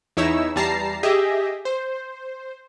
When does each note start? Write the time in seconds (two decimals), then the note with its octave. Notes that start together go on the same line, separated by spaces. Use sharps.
0.17 E2 D#4 E4 C#5 E6
0.56 E2 G3 A5 A#5 C7
1.03 G4 G#4 D#5 E5
1.65 C5